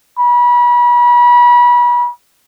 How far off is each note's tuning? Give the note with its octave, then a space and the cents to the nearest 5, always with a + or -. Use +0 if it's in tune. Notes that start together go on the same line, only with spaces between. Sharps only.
B5 -35